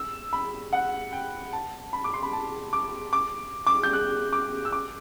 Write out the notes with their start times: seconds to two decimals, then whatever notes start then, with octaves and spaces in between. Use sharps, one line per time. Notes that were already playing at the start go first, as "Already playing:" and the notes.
Already playing: E6
0.33 B5
0.73 F#5
1.13 G5
1.53 A5
1.93 B5
2.04 D6
2.14 C6
2.23 B5
2.33 A5
2.73 D6
3.13 D6
3.67 D6
3.83 G6
3.93 F#6
4.33 D6
4.65 E6
4.72 D6